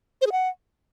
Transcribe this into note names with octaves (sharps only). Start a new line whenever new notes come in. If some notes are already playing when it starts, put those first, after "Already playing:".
C5
G#4
F#5